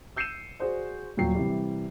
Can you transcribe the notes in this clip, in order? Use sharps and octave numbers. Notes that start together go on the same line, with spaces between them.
E6 G6 C7 C#7 D#7 E7
F#4 G#4 C5 D5
D#1 A#2 F#3 G5 C7
C3 E3 G3